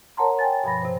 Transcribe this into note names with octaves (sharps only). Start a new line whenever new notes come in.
A#4 C#5 F#5 A5 A#5 C6
G5 G#5 A6
G2 B2 F3 B5 A#6
C3 C5